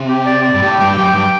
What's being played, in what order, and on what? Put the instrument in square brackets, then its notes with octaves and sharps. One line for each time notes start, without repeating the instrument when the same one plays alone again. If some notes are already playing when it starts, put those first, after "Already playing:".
Already playing: [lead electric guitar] C3
[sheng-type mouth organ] G4
D5
D5
[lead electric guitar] G2
[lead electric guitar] A2 [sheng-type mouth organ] G4
[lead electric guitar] G2 [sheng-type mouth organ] G5
[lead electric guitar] F#2 [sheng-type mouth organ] G4
[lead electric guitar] G2 [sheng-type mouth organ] G5